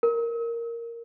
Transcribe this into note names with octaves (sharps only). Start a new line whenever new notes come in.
A#4